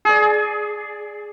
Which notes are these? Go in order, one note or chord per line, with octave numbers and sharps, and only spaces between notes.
G#4 D5